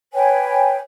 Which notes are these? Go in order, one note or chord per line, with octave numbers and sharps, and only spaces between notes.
B4 C#5 G5 G#5